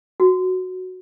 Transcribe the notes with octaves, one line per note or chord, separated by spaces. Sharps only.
F#4